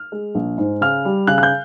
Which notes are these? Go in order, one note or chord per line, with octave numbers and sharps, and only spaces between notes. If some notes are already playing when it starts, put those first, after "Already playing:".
Already playing: F6
G#3
A#1
G#2
C#3 F6
G3
C#3 F#6
F#6
G6